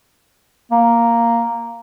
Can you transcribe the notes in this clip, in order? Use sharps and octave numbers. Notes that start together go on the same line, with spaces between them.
A#3